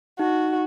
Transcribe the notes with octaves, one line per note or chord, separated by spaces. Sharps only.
D#4 F#4